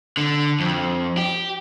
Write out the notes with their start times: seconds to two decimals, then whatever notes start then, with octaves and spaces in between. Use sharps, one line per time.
0.17 D3
0.60 F2
1.18 G4